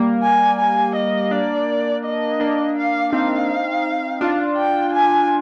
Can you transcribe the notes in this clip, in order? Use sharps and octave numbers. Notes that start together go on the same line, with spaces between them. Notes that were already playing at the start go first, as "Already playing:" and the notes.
Already playing: G3 A#3
G#5
G#5
D#5
A#3 D4 D5
D#5
A#3 D4
F5
C4 D#4 F5
D4 F4
G5
G#5